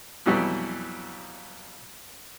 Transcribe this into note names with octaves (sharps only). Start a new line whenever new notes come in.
F2 B2 E3 F#3 G3